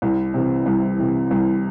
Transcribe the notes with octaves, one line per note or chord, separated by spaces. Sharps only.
C2
C3 E3
C2
C3 E3
C2